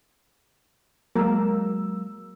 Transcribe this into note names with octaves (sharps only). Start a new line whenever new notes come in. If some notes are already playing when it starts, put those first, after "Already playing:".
F#3 G#3 A#3 A#4 E6